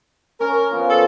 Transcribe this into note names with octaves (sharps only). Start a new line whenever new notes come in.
C#4 A#4
F3 B3 F4
A4